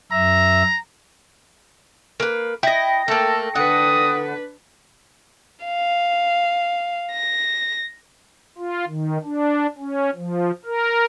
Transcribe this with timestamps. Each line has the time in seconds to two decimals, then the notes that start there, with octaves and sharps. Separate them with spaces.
0.12 F#2 E5 A#5
2.20 A#3 B4
2.63 E4 D#5 G5 A#6
3.08 A3 A#3 A4
3.55 D3 D4 B4 F#5 D#6
5.65 F5
7.12 A#6
8.58 F4
8.88 D#3
9.24 D4
9.78 C#4
10.15 F3
10.65 A#4